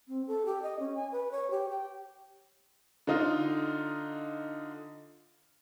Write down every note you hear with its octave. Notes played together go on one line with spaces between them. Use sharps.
C4
A4
G4
D#5
C#4
G#5
B4
C#5
G4
G5
D3 D#4 F4